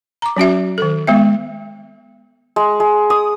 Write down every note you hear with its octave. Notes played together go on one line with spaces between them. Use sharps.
A#5 D6
F#3 C#4 F#4 E5
D#3 A4
G#3 B3 E5
G#3
G#3
D#6